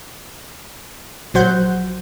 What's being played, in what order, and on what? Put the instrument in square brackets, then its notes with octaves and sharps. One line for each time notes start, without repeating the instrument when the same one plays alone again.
[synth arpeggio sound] A#1 F#3 C5 F#5 G6